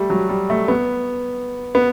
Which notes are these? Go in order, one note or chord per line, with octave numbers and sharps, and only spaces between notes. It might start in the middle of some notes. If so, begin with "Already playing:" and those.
Already playing: G3 A3
F#3
G3
A3
B3
B3